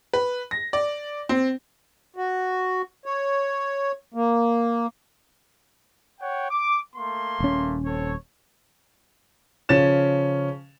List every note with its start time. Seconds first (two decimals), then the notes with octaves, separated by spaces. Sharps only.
0.13 B4
0.51 A#6
0.73 D5
1.29 C4
2.16 F#4
3.06 C#5
4.14 A#3
6.20 C#5 F#5 G5
6.50 D6
6.96 A3 A#3 C6
7.40 D#1 C#4
7.86 C4 A4 C#5
9.69 C#3 F3 C#4 A6 E7